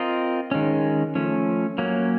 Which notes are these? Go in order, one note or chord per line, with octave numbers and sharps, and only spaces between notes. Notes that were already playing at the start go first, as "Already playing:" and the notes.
Already playing: C4 F4 A#4 D#5
D#3 G#3 C#4
F3 A3 C#4
F#3 A#3 C#4